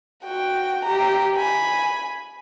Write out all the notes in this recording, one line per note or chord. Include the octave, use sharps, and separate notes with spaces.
F#4 G5
G4 A#5
G#5 B5